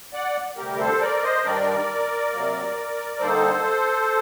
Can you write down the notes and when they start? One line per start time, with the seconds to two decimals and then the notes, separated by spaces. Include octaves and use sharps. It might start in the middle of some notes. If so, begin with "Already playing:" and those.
0.14 D5 F#5
0.57 D2 C3 G3 G4 A#4
0.79 A4 C5
1.01 A#4 D5
1.23 C5 D#5
1.44 G2 D#3 G3 D4 A#4 D5
2.32 C3 F#3 A#3
3.20 D3 G3 A#3 D#4 A4 C5